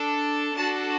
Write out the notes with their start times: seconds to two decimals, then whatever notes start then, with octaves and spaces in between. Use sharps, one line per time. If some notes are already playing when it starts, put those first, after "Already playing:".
Already playing: D4 A4
0.56 D4 F#4 A4 A5